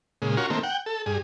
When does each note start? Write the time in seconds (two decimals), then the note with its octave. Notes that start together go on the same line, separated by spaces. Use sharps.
0.22 A#2 C#3 G#3
0.37 C#4 F4 F#4 A#4
0.50 D#3 A3 A#3 C4
0.63 F#5 G5
0.86 A4
1.06 G2 G#4